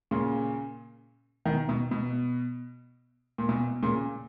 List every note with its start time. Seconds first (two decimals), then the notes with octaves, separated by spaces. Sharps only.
0.11 A#2 C#3
1.45 B2 D#3
1.69 B2
1.91 B2
3.38 A#2
3.49 B2
3.83 A#2 C#3